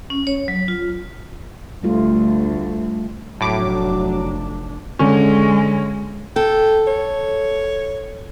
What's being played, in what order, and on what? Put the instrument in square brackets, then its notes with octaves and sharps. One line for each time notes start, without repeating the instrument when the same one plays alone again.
[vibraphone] C#4
C#5
F#3
F4
[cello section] D2 [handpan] G3 A3 F4
[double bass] F1 D4 [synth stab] A2 D6 [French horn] F#3
[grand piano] D3 C#4 [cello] G#3
[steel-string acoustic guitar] A4 [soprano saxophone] G5
[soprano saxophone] C#5